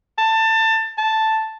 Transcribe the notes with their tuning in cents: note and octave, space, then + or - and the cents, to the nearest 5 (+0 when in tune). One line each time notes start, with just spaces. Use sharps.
A5 +20
A5 +0